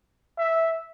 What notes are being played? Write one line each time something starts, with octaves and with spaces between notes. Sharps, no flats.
E5